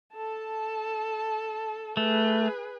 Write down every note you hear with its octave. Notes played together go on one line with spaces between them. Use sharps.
A4 A5
A3 G#4 B4